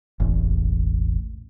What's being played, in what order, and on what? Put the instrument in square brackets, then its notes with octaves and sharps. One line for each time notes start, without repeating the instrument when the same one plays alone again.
[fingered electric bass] E1 A1